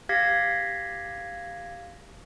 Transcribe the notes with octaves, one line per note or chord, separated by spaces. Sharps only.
G4 F5 G#6 A#6 B6